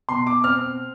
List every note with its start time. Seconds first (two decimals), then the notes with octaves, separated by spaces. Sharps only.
0.09 B2 C6
0.27 D6
0.44 C4 F6